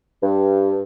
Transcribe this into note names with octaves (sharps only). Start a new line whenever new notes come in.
G2